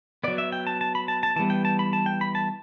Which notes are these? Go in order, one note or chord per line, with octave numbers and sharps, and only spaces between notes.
F#3 B3 D5
E5
G5
A5
A5
B5
A5
A5
E3 G3 B3 A5
G5
A5
B5
A5
G5
B5
A5